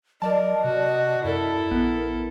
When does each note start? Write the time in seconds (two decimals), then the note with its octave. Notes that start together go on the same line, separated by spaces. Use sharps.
0.22 F#3 A#4 D5 D#5 A5
0.64 C3 F#4
1.24 F#2 E4 A4 A#4
1.71 A#1 B3